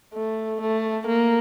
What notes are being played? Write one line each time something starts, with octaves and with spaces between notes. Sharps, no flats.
A3
A3
A#3